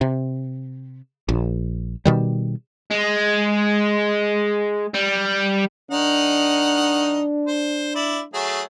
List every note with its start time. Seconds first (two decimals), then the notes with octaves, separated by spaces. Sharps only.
0.01 C3
1.29 A#1
2.05 B2 D#3 G3
2.91 G#3
4.94 G3
5.91 D#3 D4 D#4 F#5
7.47 C5
7.95 E4 D5
8.34 F#3 A3 G#4